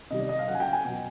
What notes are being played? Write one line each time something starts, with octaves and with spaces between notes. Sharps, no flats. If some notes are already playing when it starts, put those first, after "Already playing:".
C3 D#3 G3 D#5
D5
D#5
F5
C#3 F#3 F#5
G#5
G5
G#5
B2 F#3